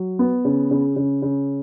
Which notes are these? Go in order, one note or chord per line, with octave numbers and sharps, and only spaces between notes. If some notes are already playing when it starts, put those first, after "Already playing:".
Already playing: F#3
B3
C#3
C#3
C#3
C#3